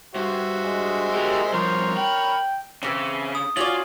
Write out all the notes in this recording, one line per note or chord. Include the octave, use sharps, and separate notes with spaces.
G2 F#4 C5 E5
G#3
G4 A#4
G2 F3 A#4 C5 C#5
G5 B5
C#3 E3 A#3 C4
D#6
C#4 F4 F#4 D5 F#7